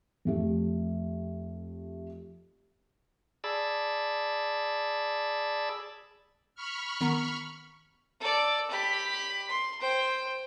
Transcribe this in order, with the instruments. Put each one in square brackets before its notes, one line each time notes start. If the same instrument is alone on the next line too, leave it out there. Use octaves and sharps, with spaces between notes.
[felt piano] F2 A3 G4
[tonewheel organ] G#4 D5 A5 B5 E6
[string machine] B5 C#6 F6
[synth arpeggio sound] D#3 B3 A#5
[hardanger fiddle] A4 D5
G4 B5
C6
C5 G5